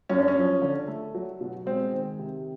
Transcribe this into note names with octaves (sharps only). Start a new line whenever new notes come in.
F#2 C#4
D4
C#4
F3
D3
A3
F#3
B2
G#3 C4
D#3
C3